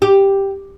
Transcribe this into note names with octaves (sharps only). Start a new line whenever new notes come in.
G4